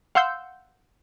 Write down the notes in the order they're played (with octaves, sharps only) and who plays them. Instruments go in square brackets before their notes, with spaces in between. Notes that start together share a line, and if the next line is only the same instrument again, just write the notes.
[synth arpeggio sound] F5 F#5 C6 E6 G6